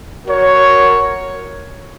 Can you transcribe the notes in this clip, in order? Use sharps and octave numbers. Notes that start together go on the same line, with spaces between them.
F#4 A#4 C#5